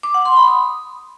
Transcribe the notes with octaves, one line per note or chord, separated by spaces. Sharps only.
D6
F#5
C6
B5
D#6